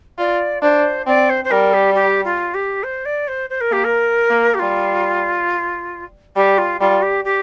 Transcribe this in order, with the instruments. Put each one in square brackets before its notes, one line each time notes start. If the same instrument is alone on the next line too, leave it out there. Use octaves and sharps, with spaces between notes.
[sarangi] F4 [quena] D5
[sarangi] D4 [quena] C5
[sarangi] C4 [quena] D5
[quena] C5
C5
[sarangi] G3 [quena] A#4
[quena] G4
G4
F4
G4
C5
D5
C5
C5
A#4
[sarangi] A#3 [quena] G4
[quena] A#4
[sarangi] A#3
[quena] G4
[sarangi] G3 [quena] F4
[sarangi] G3 [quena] G4
[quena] F4
[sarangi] G3 [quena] F4
[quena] G4
G4